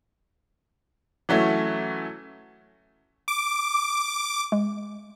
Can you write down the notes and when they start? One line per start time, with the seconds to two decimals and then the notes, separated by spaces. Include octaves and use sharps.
1.29 E3 F#3 A3 C#4
3.28 D6
4.52 G#3